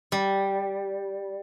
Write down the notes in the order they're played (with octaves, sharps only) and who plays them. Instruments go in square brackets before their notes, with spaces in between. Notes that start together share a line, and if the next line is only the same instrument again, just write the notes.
[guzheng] G3